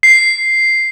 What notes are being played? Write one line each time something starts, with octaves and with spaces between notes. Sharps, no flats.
C7